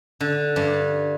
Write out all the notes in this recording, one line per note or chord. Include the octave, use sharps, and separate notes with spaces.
D3
G2